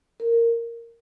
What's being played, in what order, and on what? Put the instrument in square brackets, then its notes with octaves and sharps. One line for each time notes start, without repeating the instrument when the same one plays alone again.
[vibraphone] A#4